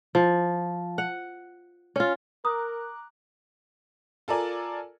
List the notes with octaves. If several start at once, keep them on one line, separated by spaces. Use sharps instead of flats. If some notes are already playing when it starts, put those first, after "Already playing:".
F3
F#5
C#4 F4
A#4 A#5 D6 D#6 F#6
F4 A4 A#4 D5 G#5